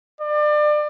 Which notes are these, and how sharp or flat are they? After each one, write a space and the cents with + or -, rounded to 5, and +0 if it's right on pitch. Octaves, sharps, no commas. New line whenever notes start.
D5 +30